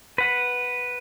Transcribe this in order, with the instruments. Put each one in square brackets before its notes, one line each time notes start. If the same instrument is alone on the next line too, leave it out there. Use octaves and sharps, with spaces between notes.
[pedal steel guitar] B4 F#5